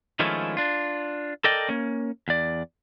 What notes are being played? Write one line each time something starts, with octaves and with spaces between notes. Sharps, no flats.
D#3 F3 G#3 A3 C#4 E4
D4 F4
A4 A#4 D5 D#5 G5
A#3 C#4
E2 D5